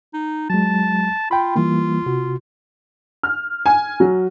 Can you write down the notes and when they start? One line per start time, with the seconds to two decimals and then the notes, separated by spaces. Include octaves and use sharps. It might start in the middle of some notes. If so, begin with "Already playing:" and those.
0.14 D#4
0.50 F#3 G#3 A5
1.31 F4 G5 B5
1.56 E3 G3 A#3 F4
2.06 C3 F#4
3.23 F6
3.66 G#5
4.00 F#3